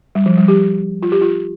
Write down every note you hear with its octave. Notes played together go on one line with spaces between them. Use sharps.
G3
F3
G3
G4
F4
G4
F4